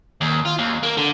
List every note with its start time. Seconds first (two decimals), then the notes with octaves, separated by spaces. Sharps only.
0.21 D#2
0.45 F4
0.58 D#2
0.83 A#3
0.97 D3